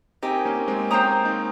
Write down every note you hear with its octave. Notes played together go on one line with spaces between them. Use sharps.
C4 D#4 G4 A#4 D#5 G#5
A#3 C#4
G#3 C4
A#3 C#4 C5 G5 A#5 D#6
C4 D#4